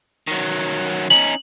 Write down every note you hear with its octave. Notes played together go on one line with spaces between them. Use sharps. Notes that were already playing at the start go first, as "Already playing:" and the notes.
D#3 F#3
C#4 D#4 F#7